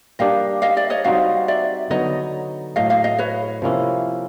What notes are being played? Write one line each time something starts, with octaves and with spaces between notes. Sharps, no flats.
G3 A#3 D4 G4 D#5 F5
D#5 F5
D5 E5
C#5 D#5
G3 C4 D#4 F#4 D#5 F5
D5 E5
D3 F#3 B3 D#4 C#5 D#5
A2 F#3 A3 D#5 F5
D#5 F5
D#5 F5
B4 C#5
C3 F3 A#3 C#4 E4